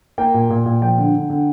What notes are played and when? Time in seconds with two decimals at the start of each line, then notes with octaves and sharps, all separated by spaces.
0.18 A#3 G5
0.34 A#2
0.50 A#2
0.66 A#2
0.82 F3 G5
0.98 D3
1.14 D3
1.30 D3